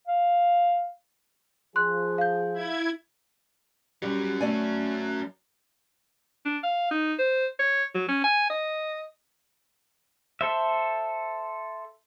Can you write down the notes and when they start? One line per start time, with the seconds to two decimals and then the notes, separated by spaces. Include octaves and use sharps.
0.07 F5
1.76 F3 G#4 C6 F#6
2.18 F5 G6
2.53 E4 G#6
4.02 F#3 G3 C#4
4.41 A3 D5 G#5
6.46 D4
6.63 F5
6.91 D#4
7.19 C5
7.59 C#5
7.95 F#3
8.08 C#4
8.24 G#5
8.50 D#5
10.41 A4 C5 E5